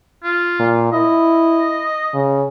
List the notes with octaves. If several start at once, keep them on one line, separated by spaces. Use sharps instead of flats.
F4
A#2
E4 D#5
C#3